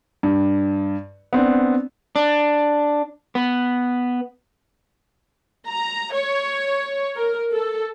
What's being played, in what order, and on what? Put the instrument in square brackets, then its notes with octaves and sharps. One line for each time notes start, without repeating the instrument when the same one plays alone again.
[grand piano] G2
B3 C4 D4
[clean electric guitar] D4
B3
[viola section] A#5
C#5
A#4
A4